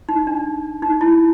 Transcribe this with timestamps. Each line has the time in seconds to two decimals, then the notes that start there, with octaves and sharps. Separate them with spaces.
0.09 D#4
0.27 D4
0.82 D#4
1.01 E4